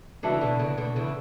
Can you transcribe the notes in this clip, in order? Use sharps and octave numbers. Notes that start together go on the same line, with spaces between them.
C#3 E3 D4 F#4 A4 E5
B2 D3
C#3 E3
B2 D3
C#3 E3